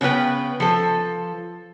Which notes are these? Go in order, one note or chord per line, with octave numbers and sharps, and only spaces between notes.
C#3 B3 C4 B4 G5
F3 A4